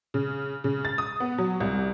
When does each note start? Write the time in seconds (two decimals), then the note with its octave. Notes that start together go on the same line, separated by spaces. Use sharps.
0.14 C#3
0.64 C#3
0.85 A6
0.98 D#6
1.20 B3
1.38 F#3
1.60 C2